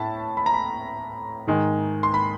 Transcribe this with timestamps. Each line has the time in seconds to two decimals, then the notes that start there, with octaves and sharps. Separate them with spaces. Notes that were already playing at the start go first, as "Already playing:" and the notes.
Already playing: A2 A5 B5
0.37 B5
0.46 A#5
0.54 B5
1.47 G#2 D#3 G#3
2.03 C6
2.14 B5